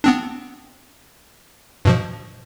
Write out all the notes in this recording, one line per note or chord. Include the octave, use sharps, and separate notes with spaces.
B3 C4 D4
G2 B2 F3